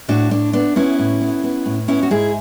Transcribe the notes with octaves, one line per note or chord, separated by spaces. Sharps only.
A2 D4 F#4
A2 D4
B3 D4
B3 C#4 E4
A2
B3
B3
A2
B3 C#4 E4
F#4
G#2 E4 G#4